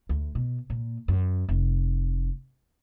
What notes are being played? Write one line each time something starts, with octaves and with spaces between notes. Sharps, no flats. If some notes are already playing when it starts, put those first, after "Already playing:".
D2
B2
A#2
F#2
F1